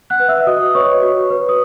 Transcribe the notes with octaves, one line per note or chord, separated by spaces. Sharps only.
F#5 F#6
B4
E5 E6
F#4 D#5 D#6
B4 C#5 C#6
F#4
B4
D#6